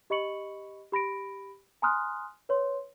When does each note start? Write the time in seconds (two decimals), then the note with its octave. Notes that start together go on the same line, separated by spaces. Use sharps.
0.10 G4 D#5 B5 C#6 C#7 F#7
0.92 G4 B5 A#6 D7
1.82 G#5 A#5 C6 D#6 F6 F#6
2.49 B4 C#5 C6